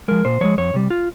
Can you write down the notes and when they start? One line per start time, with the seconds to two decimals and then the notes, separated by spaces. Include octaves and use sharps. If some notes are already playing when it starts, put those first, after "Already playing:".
0.08 F3 G#3 A#4
0.25 A#2 C5
0.41 F3 G#3 C#5
0.58 F2 C#5
0.74 C3 G3
0.90 F4